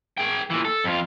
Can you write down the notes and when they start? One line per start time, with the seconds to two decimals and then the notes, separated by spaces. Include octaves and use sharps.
0.17 G#4 G5
0.50 A#2 E3
0.65 A4
0.84 F2 F4